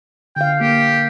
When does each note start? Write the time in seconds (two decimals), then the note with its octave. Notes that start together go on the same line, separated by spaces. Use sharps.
0.36 D3 F5 G5
0.61 A#3 G4